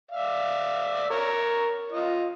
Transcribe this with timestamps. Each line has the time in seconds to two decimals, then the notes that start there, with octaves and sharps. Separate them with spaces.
0.12 D5 E5 F5
1.10 A#4 C#5
1.92 F4 D#5